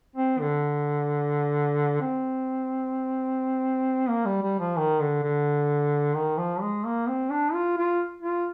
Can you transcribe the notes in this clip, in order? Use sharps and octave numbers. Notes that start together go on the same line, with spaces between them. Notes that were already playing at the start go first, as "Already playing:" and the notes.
C4
D3
C4
A#3
G3
G3
F3
D#3
D3
D3
D#3
F3
G#3
A#3
C4
D4
F4
F4
F4